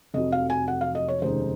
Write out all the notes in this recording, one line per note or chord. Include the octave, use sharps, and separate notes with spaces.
F1 F2 C3 F#3 D#5
F5
G#5
F#5
F5
D#5
C#5
F1 D#2 C#3 G#3 D#4 C5